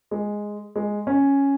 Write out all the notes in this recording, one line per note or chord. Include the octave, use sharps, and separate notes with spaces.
G#3
G#3
C#4